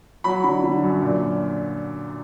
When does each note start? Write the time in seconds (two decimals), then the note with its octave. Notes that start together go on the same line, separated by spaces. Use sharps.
0.24 F#3 B5
0.44 D3 B5
0.63 D3
0.83 F#2
1.02 A#2